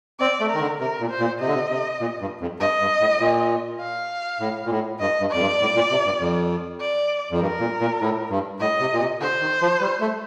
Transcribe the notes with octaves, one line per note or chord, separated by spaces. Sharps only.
C4 D5
A3
D#3 A#4
D3
C3 A#4
A#2
C5
A#2
C3 D#5
D3
C3
C3
A#2
G2
F2
G2 D#5
G2
A2
A#2
F5
A2
A#2
A2
G2 D#5
G2
F2 D5
G2
A2
A#2
C3
G2
F2
D5
F2
G2 A#4
A#2
A#2
A2
G2
A2 D#5
C3
A#2
C3
D3 C5
D#3
F3
G3
A3